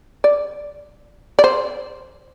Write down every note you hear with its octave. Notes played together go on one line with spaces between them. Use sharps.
D5
D5
C5